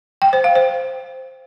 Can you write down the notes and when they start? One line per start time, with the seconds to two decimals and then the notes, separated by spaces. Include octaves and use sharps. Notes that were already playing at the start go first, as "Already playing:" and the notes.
0.22 G5
0.33 C5
0.44 F5
0.56 C5